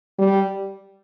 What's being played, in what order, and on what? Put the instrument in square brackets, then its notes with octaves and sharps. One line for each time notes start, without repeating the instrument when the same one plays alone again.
[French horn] G3